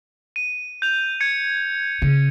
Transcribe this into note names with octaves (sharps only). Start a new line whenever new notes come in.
D#7
G6 F7
G#6 C#7
C#3